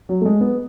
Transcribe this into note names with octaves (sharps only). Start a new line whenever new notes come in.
F#3
A3
G#3
B3